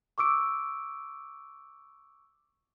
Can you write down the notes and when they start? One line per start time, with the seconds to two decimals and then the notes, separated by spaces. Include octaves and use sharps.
0.18 C#6 D6 E6 D7